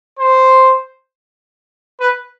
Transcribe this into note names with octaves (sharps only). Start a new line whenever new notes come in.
C5
B4